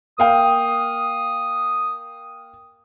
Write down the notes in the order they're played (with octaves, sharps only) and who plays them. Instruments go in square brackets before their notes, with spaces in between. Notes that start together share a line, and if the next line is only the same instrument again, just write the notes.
[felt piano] A#3 F5 G5 [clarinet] D#6